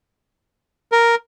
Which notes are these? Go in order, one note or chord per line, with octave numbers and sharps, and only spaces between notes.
A#4